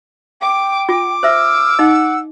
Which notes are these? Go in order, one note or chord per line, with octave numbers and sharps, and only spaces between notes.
G5 D6
F4 D6
C5 E5 E6 F6
D#4 D#5 F#5